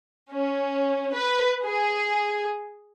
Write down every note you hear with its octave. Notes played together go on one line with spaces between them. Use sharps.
C#4
B4
G#4